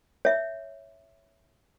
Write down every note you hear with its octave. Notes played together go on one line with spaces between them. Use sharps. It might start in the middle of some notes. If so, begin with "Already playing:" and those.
C#5 E5